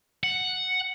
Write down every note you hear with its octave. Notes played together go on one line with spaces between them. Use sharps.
F#5